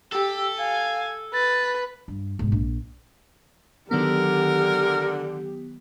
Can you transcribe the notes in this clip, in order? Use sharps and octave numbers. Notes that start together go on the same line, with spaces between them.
G4 A4 E6
F5 G#5
B4 A6
G2
G#2 B2
A#1
D3 D#3 F#3 B3 G4 A#4